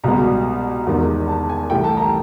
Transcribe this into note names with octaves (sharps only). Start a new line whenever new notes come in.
C2 B2 G#3 B3 A#5
E2 C3 D#3 G#3 B3
A5
G#5
C2 C3 E3 A3 G5
A5
A#5